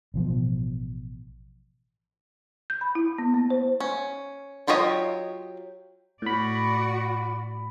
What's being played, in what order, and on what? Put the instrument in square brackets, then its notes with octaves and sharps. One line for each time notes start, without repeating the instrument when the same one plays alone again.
[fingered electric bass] A1 B2 F3
[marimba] G6
B5
E4
B3
A#3
C5
[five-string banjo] C#4
F#3 F4 G4 C#5 D#5
[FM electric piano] A2 B5 [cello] F#4 D5